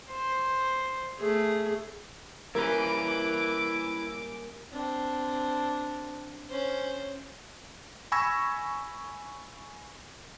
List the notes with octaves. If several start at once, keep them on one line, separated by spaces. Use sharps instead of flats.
C5
A3 G#4
G3 A#3 C#4 E4 A#4 B4 D6
C4 D4
C#4 C5
G#5 B5 C#6 E6 G#6 A#6